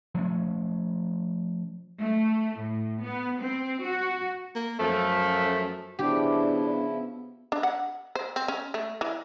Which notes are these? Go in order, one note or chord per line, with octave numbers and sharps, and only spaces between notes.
F3 A3 C#4
A3
A2
B3
C4
F#4
A#3
F#2 F3 A3
C#3 F3 B3 D4 E4 G4
D4
F#5
C5
C4
C#4
A3
E3